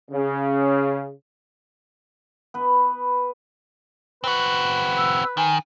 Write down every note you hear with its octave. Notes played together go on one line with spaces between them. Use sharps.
C#3
B3 B4
C4 F#4 B4
E6
D#3 G#5